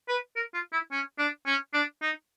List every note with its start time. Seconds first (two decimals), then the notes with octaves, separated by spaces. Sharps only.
0.08 B4
0.36 A#4
0.54 F4
0.73 E4
0.91 C#4
1.19 D4
1.46 C#4
1.73 D4
2.02 D#4